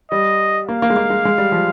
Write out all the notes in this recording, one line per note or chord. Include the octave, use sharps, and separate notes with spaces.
G3 D#5
A#3 F5
A#3
G#3
A#3
G#3
G#3
G3
F3